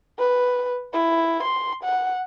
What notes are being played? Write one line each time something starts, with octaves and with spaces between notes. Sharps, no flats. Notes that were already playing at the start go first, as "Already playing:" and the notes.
B4
E4
C6
F#5